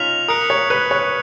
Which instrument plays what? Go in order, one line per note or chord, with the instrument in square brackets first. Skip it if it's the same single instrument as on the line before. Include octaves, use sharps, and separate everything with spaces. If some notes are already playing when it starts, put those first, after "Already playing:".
Already playing: [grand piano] C#4 D#4 F4 [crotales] F6 B6 F7
[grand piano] A#4 [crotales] D#6 F#6 C#7
[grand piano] C#5
B4
C#5